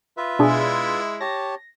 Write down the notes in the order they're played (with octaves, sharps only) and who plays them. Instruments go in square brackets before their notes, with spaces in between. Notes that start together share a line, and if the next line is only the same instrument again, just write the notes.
[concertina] F4 B4 E5
[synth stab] B2 D4 G#4 [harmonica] G#3 E4
[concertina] G4 C#5 A5 [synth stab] A#6